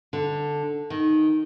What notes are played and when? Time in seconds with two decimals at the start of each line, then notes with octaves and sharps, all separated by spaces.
0.13 D3
0.90 D#3